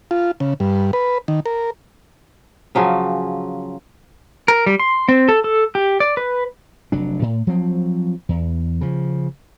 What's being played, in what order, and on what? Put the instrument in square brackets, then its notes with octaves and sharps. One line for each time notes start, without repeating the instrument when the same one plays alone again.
[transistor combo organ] F4
C#3
G2
B4
D#3
A#4
[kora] C#3 F3 F#3 C#4
[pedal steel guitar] A#4
G3
C6
C4
A4
A4
G4
D5
B4
[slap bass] F1 F#3 D4
A2
F3 F#3 C4
E2
C#3 F3